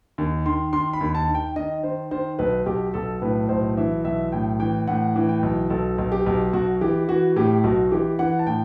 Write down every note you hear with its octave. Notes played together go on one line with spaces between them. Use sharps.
D#2
D#3 C6
D#3 C6
B5
D#2
A5
D#3
G5
D#3 D#5
D#3 C5
D#3 C5
B1 B4
B1 G4
B1 A4
A2 B4
B1 C5
E3 E5
B1 E5
A2 G5
E3 G5
A2 F#5
E3
G5
B1
B1 A4
B1
G4
B1
B1 F#4
E3 G4
E3 F#4
A2 G4
B1 F#4
E3 G4
E3 F#5
A5
A2 G5